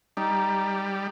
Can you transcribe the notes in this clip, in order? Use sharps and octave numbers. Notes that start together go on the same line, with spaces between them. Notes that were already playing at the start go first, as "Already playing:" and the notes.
G3 D#4